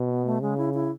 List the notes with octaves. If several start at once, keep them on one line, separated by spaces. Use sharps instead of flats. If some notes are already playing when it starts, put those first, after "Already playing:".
Already playing: B2
B3
A3
C#3 G#3
E4
E4